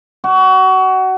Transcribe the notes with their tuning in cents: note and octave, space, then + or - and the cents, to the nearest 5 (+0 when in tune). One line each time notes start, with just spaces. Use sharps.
F#4 +25